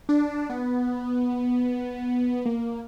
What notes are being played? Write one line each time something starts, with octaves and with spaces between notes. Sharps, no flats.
D4
B3
A#3